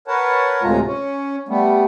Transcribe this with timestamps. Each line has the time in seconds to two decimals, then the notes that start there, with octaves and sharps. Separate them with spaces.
0.08 A#4 B4 C#5 F#5 A5
0.63 D2 A2 C3 G#3 F4 A#5
0.85 C#4
1.49 G3 A3 B3